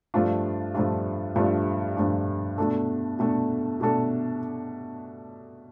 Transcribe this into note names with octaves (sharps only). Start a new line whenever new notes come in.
G2 F3 A3 D4 F4
G2 F3 A3 D4 F4
G2 F3 A3 D4 F4
G2 F3 A3 D4 F4
B2 A3 D4 A4
B2 A3 D4 A4
B2 A3 D4 A4